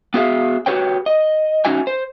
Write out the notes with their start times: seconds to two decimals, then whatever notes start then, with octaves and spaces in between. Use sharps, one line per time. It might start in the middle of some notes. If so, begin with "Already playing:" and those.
0.14 B3 F#4 G#4 E5 F5
0.66 F#4 G4 B4 C#5 G5
1.06 D#5
1.65 C#4 D#4 F#4 E5 G#5
1.87 C5